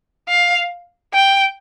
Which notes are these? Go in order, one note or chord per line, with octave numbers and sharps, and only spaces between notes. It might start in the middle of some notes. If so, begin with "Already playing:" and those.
F5
G5